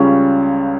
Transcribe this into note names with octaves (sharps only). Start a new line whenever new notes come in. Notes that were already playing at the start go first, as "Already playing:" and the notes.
Already playing: C#2 C#3 G3 C#4